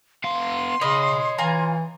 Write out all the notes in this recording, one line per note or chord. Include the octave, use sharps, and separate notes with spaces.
B3 F5 C6
C#3 C#5 D#5 B5
E3 F4 G#5 A#5